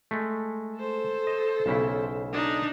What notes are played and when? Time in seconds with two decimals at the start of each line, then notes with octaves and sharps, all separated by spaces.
0.11 G#3 A3
0.76 A4 C5
1.27 D#5
1.66 B1 C#3 E4
2.33 D4 D#4